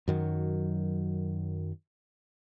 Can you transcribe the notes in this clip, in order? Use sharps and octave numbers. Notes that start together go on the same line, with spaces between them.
F#2 D#3 F#3